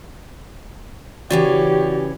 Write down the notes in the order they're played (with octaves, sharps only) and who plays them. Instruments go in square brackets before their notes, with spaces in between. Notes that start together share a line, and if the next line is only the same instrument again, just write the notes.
[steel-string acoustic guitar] C#3 E3 C#4 [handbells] F#4 D5 [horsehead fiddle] G4